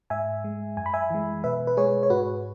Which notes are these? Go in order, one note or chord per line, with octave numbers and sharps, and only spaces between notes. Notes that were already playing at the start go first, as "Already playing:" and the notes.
G#2 E5 G#5
G#3
F#2 G#5
B5
E5 G#5
E3 G#3
B2 B4 E5
B4
G#3 G#4 C#5
C#5
G#2 F#4 B4